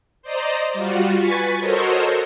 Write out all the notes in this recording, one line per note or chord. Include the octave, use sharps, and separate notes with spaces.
C5 D5 D#5 A#5
G3 F4 F#4
B4 G#5 C#6 A6 B6
F#4 A4 A#4 C5 C#5 D#5